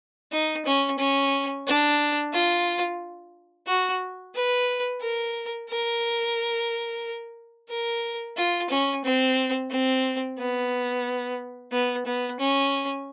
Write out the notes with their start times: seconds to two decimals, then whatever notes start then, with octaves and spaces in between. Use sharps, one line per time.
0.32 D#4
0.65 C#4
0.99 C#4
1.67 D4
2.33 F4
3.67 F#4
4.35 B4
5.01 A#4
5.69 A#4
7.69 A#4
8.37 F4
8.70 C#4
9.04 C4
9.70 C4
10.38 B3
11.72 B3
12.06 B3
12.39 C#4